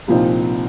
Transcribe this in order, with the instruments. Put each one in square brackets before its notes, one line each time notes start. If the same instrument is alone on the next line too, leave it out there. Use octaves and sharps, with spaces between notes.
[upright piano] C2 A#2 F3 C4 D#4